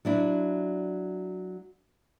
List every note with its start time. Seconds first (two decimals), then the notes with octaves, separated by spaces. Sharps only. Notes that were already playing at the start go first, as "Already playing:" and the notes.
0.05 F#3 D4 E4